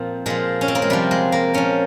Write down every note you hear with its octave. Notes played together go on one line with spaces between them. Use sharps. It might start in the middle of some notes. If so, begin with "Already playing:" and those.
Already playing: A#2 F3 C4
A#2 F3 G#3
C#4
C4
A#3
G#3
C3 F3 G3
G#3
A#3
A#2 F3 C#4